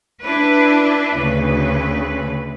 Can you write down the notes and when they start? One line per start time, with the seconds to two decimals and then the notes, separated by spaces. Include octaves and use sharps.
0.23 D4 E4 B4
1.17 D2 C#3 B4